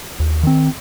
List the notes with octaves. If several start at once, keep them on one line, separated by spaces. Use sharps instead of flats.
D#2
D#3 C4